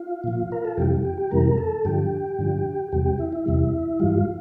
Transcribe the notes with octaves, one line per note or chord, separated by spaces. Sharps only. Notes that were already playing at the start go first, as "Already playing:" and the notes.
Already playing: F4
A#2 F3
A#4
A4
F2 C3 E3 G3 G4
G4
G4
F2 C3 E3 G3 A#4
A4
G2 D3 F3 G4
G2 D3 F3
E2 C3 G3 G4
G4
E4
E4
E2 C3 G3
G2 E3 G3 F4